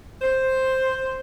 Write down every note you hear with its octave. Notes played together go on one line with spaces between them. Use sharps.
C5